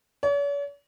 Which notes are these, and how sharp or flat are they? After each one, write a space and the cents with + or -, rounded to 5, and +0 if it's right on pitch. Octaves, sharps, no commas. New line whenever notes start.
C#5 +45